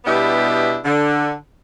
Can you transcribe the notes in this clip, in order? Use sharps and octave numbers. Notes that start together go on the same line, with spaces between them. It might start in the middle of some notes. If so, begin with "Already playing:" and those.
B2 G3 B3 D4 E4 G4
D3